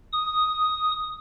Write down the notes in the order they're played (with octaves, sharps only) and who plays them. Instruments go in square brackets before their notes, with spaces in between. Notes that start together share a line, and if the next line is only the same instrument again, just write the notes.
[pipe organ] D#6